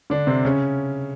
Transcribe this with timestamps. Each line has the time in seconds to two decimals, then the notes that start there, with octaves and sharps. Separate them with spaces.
0.10 D3 D4
0.27 C3 C4
0.45 C#3 C#4